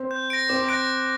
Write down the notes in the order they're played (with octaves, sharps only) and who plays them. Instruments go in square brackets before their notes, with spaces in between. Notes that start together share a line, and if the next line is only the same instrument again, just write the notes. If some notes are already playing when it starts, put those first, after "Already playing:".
Already playing: [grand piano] C4
[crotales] G6
A#6 D7
[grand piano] C4 [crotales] D6
[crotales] F#6 A#6 D7